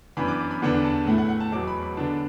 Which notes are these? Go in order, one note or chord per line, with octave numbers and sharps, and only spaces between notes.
F#2 E3 B3 D4 B5
D6
B5
E2 D3 B3 D4 F#5
A5
A2 A3 E4 F#5
F#5
F#5
A5
E2 B2 F#3 D6
B5
B5
D3 B3 D4 A5